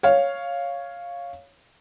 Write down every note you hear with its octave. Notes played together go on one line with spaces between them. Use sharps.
C#5 F5